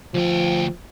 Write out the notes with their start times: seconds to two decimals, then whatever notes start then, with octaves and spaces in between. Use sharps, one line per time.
0.14 D2 F3 G5